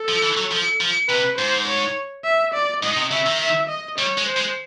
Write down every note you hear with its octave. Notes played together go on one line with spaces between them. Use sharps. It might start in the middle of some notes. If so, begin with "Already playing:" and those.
Already playing: A4
F3
E3
F#3
F3
F3
C3 B4
G#2 C5
C#5
E5
D5
G#2 D#5
C3
C#3 E5
D#3
E5
D#5
G3 C#5
G#3
C5
G#3